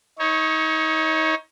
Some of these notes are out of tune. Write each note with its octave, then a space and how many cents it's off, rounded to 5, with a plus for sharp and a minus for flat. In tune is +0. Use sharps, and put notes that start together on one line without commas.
D#4 +30 C#5 -10